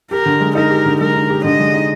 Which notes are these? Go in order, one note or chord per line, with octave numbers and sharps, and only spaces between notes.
G4 A#4
D3
G#3
D#4 A#4
G4
D3
G#3 A#4
D#4
G4
D3 D#5
G#3
D#4